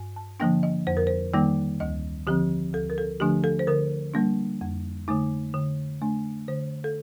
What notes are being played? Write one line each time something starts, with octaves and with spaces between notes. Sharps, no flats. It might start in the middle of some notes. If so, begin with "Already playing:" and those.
Already playing: G2
A5
D3 F3 A#3 D4 G5
D#5
F2 C5
A#4
C5
D#3 G3 A#3 D#4 G5
D2 D#5
D3 F3 C4 G4
D2 A4
A#4
A4
D3 F3 A3 D4 G4
A4
C5
D3 A#4
G3 A#3 D4
F2
D3 A3 D#4
D3
A3 D4
D3 C5
A4